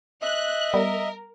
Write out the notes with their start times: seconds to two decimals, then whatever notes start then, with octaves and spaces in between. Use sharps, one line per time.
0.22 D#5 E5 F#6
0.74 G3 B3 A#4